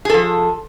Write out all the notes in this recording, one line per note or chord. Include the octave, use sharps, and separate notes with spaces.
F3 G#4 A4